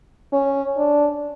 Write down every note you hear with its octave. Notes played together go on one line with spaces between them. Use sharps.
C#4
D4